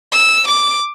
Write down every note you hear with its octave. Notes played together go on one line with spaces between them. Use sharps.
E6
D6